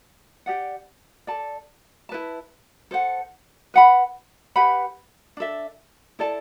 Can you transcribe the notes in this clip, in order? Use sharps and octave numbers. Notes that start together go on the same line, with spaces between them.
G4 D5 F#5
A4 D5 A5
E4 B4 D5 A5
A4 C5 F#5
B4 F#5 B5
G4 B4 F#5 B5
D4 A4 E5
E4 A4 D5 A5